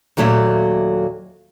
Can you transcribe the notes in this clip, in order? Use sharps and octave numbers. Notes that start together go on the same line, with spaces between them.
D#2 A#2 F#3 A3 C#5 E5